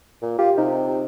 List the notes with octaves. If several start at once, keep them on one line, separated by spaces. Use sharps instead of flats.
A#2
F4 G4
C3 D#4